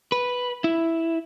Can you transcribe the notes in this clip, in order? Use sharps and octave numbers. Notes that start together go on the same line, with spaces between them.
B4
E4